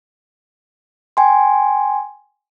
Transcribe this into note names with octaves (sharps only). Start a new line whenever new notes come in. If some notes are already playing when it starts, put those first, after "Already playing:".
G5 G#5 C6